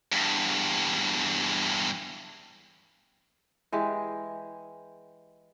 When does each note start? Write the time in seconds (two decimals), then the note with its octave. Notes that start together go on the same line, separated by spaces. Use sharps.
0.12 E2 G2
3.72 E3 G#3 G4